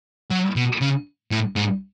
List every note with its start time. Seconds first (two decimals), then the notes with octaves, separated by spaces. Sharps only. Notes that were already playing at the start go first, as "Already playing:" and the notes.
0.31 F#3
0.56 B2
0.81 C#3
1.31 A2
1.56 G#2